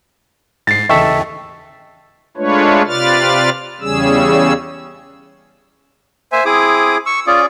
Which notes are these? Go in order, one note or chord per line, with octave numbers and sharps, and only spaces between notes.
G#2 A6 C7
D#2 C#3 E3 A4 D#5 E5 G5 C#6
G#3 A3 D4 F4 B4 C#5
C3 F4 B4 D5 F6 A6
E2 C#3 G3 C#4 G#4 E6
A#3 C5 E5 G#5
C4 E4 G#4 D6 D#6
C#6 E6
C#4 F4 G#4 D5